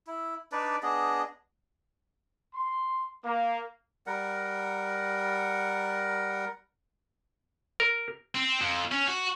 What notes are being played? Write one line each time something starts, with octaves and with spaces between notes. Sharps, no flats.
E4
D4 D#4 B4 D5
B3 D4 G#4 D#5
C6
A#3
G3 A#4 F#5
A#4
C4
F2
C#4
F#4